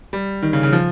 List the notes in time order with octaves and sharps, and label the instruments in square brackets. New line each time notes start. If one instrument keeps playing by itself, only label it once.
[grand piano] G3
D#3
C#3
C#3
F3